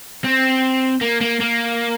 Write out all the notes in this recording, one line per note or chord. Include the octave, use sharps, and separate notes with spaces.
C4
A#3
A#3
A#3